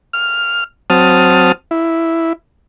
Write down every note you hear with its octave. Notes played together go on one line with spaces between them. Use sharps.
F6
F#3 C4 A5 D#6 F6
E4